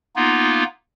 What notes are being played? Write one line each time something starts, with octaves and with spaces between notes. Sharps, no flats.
A#3 B3 D#4 F4